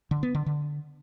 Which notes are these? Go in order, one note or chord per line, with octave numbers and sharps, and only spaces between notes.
D3
B3
D3
D3